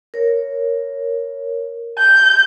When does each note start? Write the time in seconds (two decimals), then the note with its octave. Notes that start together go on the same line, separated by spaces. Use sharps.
0.14 A#4 C#5
1.98 G6